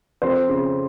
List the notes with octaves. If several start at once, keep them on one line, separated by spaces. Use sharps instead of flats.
F2 C5
C#3